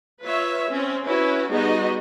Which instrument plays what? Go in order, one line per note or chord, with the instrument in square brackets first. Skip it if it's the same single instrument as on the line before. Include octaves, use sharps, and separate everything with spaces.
[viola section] F4 B4 C#5 E5
C4 C#4
C#4 E4 F#4 B4
G3 B3 D#4 F#4 G#4 D#5